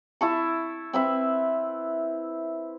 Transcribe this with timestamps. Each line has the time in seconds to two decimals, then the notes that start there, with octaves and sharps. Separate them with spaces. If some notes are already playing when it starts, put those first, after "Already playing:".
0.21 E4 A5 C#6
0.93 C4 B4 E5